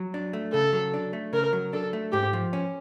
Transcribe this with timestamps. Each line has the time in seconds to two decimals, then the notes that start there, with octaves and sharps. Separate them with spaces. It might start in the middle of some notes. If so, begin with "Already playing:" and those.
Already playing: F#3
0.14 D4
0.33 A3
0.53 C#3 A4
0.73 F#3
0.94 D4
1.13 A3
1.33 C#3 A#4
1.53 F#3
1.73 D4 A4
1.93 A3
2.12 G#2 G4
2.33 F3
2.53 C#4